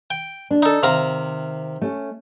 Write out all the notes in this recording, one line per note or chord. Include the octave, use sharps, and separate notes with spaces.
G5
D4
D#4 A4
C3 D#3 F5 A#5
A3 C#4